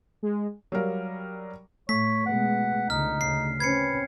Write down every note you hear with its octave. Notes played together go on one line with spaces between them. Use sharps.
G#3
F#3 G3 A#4 F5
A2 A3 C#5 B6
B2 G#3 B3 F#5
C#2 D3 D#4 F6
D2 C#3 C7
C4 C#4 B4 G#6 C7 C#7